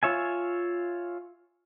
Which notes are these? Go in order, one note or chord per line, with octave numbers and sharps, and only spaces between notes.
F4 C#5 E5 G#5